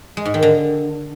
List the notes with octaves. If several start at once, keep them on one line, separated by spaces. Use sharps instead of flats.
G#3
G#2
D#3
D3